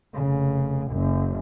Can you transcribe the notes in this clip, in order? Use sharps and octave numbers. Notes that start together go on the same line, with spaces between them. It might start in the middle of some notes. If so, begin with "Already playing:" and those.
F1 C#3
F#1 F#2